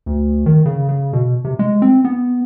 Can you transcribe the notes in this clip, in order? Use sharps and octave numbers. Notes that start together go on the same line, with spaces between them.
D2
D#3
C#3
C#3
B2
C3
G#3
C4
B3